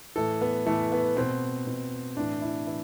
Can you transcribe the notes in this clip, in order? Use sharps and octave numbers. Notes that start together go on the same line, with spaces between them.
A2 E3 A4
B3
A2 E3 A3
B3
B2 C4
B2
A2 E3 D4
E4
E3 E4